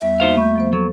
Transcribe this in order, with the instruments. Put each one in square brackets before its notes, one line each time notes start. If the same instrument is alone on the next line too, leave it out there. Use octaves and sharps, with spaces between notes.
[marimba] E2 G3 B3 [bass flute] E5
[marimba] A#3 F#4 [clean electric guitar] D#4 C5 F5
[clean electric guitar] A3 [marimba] B5 G6
[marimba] F3 B3 C5
[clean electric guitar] F#3 [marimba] A4